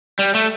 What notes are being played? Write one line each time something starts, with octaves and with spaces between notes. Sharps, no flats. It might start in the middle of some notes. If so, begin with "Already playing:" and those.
G3
A3